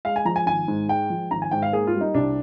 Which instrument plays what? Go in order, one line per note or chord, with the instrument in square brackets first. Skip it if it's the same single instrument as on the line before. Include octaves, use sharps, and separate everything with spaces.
[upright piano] G#3 F5
G#5
F3 A#5
G#5
G#1 G#5
G#2
G#3 G5
F3
G#1 A#5
G#5
G#2 G5
F5
A#3 G#4
F4
G3
D#4
C2 D4